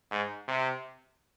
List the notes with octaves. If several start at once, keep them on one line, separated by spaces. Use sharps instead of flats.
G#2
C3